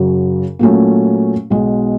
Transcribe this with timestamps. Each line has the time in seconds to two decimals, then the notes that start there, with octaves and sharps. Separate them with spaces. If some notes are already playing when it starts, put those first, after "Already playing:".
Already playing: F#2 C#3 F#3
0.59 A#2 F#3 A3 C#4
1.50 B1 B2 G#3